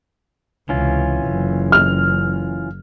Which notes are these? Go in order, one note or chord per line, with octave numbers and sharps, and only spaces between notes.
C#2 C3 E3 C#4 F4
F#1
F6